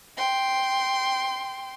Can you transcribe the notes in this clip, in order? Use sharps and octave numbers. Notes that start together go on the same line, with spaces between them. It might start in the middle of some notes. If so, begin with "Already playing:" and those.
G5 C6